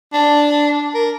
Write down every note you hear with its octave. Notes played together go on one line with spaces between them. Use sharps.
D4
A#4